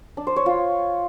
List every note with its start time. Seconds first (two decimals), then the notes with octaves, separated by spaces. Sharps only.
0.17 D4
0.27 C5
0.36 C#5
0.46 F4